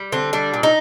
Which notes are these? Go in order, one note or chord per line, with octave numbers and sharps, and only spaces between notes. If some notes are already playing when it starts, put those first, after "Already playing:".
Already playing: G3
D3 C4
G3 D4
A#2
D#4